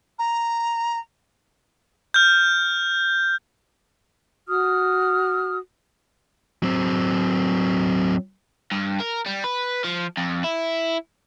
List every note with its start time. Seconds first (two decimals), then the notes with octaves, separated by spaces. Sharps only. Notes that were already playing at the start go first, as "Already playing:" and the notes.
0.19 A#5
2.14 F6 G6
4.48 F#4 D#6 F6
6.63 F#3 C4
8.71 G2
9.00 A#4
9.26 G3
9.44 B4
9.84 F3
10.17 F2
10.44 E4